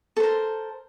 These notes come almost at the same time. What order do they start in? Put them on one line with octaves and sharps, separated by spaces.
A4 C5 A#4